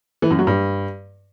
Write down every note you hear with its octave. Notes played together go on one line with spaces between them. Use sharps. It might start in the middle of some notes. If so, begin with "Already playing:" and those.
E3
F#2
F#3
G2